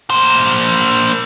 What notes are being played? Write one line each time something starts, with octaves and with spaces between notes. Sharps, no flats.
A#3 C5